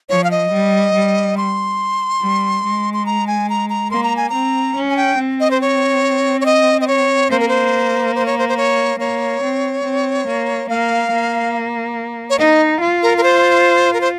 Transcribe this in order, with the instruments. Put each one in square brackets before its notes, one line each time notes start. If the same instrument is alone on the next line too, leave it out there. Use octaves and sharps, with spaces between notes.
[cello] F3 [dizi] C#5
[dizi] F5
D#5
[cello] G3
G3
[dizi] C6
[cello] G3
G#3
[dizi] C6
A#5
G#5
A#5
A#5
[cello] A#3 [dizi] C6
[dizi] A#5
G#5
[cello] C4 [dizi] A#5
[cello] C#4
[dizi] G#5
G5
[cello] C4
[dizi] D#5
C5
C#5
C#5
D#5
D#5
C#5
[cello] A#3 [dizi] C5
[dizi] A#4
C5
C5
C#5
C5
C5
C#5
[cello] A#3 [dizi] C#5
[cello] C4
C4
A#3
[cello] A#3 [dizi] F5
[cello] A#3
[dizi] C#5
[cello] D#4 [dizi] D#5
[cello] F4
[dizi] A#4
A#4
C5
A#4
C5